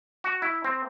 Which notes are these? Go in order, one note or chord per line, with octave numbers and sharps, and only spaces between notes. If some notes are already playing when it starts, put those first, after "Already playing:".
F#4
E4
C4